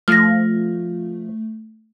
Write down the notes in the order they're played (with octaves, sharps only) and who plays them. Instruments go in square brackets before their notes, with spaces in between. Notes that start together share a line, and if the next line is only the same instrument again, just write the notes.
[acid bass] F3 [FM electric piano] A3 [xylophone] F6 A#6